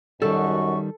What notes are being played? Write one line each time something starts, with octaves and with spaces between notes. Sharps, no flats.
F#2 D#3 G3 F#4 A4 D#5 C#6